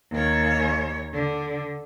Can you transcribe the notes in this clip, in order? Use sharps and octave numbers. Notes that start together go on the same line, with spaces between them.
D#2 C#5
D3